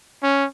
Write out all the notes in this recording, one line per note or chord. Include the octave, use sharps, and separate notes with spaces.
C#4